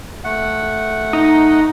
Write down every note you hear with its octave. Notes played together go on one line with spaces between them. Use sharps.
A3 F#5
D#4